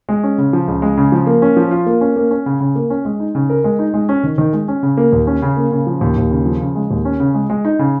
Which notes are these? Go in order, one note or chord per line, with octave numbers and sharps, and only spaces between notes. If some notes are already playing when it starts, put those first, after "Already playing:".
G#3
C#4
C#3
F3
C#2
G#3
C#3
F3
A#3
C#4
F3
F4
A#3
C#4
A#3
C#4
C#3
C#3
A#3
C#4
G#3
D#4
C#3
A#4
G#3
D#4
G#3
C#4
D#3
D#3
G#3
C#4
C#3
A#3
D#2
C#4
C#3
A#3
C#3
F3
D#2
D#2
C#3
F3
C#3
G#3
D#2
C#4
C#3
G#3
G#3
D#4
C#3